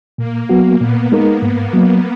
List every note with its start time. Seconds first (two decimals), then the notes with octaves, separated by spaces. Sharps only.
0.18 A#2 A#3
0.49 F#3 B3 F#4
0.81 A#2 B3
1.12 G#3 D#4 A#4
1.42 G#2
1.73 F#3 A#3